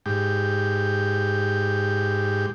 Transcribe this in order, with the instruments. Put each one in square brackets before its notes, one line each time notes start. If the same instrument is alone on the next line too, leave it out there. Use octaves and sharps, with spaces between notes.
[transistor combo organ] G#2 G4